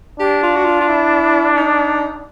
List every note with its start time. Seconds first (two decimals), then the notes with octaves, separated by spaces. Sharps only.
0.19 D4 G4
0.42 F4
0.56 F#4
0.65 F4
0.80 F4
0.88 E4
1.56 D#4